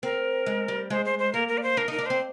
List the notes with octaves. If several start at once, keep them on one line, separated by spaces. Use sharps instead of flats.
C4 A#4
G#3
G3
G#3 C5
C5
C5
A#3 A#4
A#4
D5
C5
D4 A#4
D#4 A#4
D4
C4 C5